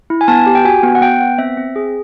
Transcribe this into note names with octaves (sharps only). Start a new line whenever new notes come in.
E4
G#5
B3 A5
G4
G5
F#4 G#5
B3
F#5
B3 G5
B3
C4 E5
C4
G#4